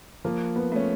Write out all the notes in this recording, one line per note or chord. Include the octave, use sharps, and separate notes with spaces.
F3 A#3
B3
A3 C#4